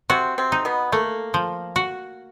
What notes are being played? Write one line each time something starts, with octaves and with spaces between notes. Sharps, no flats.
C3 C4 F#4
C3 C4
D#4
B2 B3
A3 A#3
F3
F#4